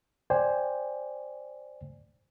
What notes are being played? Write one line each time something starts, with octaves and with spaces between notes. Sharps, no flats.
C5 D5 G5 G#5